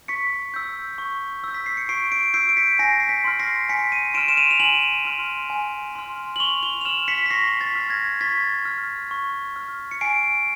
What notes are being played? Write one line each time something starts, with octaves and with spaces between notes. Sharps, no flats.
C#6 B6 C#7
E6 G6
C#6
E6 G6
B6
C7
C#7
C#6 C7 D7
C7 D7
E6 G6 C7 D7
D7
B6 C#7
G#5 A#6 C7
C7
B6 C#7
C6 F6
A#6 C7
G#5 B6 C#7
C#7 D#7
C6 F6 D7 E7
E7
D#7 F7
F7
G#5 E7 F#7
C6 F6
G#5
C6 F6
F#7
C#6 F7 G7
F7 G7
F7
F6 E7 F#7
B6 C#7
B6
C#6 A#6 C7
A6 B6
F6
G#6 A#6
C#6 A6 B6
F6
C#6
F6
C#7
G#5 C7 D7